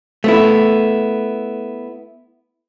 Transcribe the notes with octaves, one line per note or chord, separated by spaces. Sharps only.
A3 B3 E4